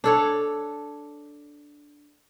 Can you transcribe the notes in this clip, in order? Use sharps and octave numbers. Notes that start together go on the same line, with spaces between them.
D4 A4 C#5